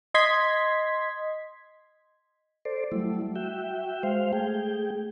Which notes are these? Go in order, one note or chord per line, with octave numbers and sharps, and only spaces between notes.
D#5 C6 G#6 B6
A4 C5 D5
F#3 G3 A3 E4
F#4 E5 G5
G#3 C5 F5
A3 G#4 G5